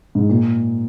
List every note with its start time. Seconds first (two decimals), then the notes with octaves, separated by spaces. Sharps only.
0.15 G#2
0.30 A#2